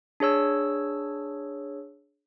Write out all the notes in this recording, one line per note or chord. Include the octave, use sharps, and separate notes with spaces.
D4 G#4 C#5 E6